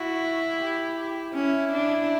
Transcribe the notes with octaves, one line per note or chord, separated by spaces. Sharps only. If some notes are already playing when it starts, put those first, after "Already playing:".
Already playing: E4 F#4
G4
C#4 E4
D4